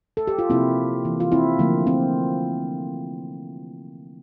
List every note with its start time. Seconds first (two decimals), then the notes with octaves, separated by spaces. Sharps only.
0.17 A4
0.27 G4
0.39 F4
0.50 C3 F3 A#3 C4 E4
1.05 E3 A#3
1.20 F4
1.32 C4 E4
1.59 D3 F3 A3 A#3
1.87 C4